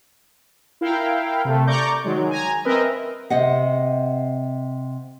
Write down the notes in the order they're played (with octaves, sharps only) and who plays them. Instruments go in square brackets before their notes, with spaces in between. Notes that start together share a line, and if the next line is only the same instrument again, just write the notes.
[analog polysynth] E4 A#4 F5 G5
C3 A3
D5 A#5 C#6 D6 G6
D#3 F#3 G#3
G#5 A#5
C4 A#4 B4 D#5 E5
[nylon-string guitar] C3 D#5 F#5